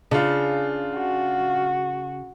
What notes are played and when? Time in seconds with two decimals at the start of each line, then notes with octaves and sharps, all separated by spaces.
0.11 C#3 D4 F4
0.95 F#4